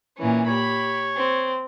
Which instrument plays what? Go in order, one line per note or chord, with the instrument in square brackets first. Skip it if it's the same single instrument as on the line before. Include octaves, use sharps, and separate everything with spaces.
[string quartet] A#2 E3 C#4
[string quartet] G4 B5 [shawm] C#5
[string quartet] C4